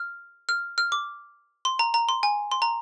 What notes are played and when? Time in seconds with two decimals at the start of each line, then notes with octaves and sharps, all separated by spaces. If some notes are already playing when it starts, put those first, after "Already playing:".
Already playing: F6
0.49 F6
0.78 F6
0.92 D6
1.65 C6
1.79 A#5
1.94 A#5
2.09 C6
2.23 G#5
2.52 C6
2.62 A#5